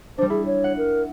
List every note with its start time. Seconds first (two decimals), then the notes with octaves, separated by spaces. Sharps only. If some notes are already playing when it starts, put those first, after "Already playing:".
0.18 G3 D4 C5
0.30 E4 G#4
0.46 C#5
0.64 F#5
0.77 A#4